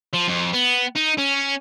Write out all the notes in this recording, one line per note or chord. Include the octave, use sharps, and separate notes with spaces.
F3
F2
B3
D#4
C#4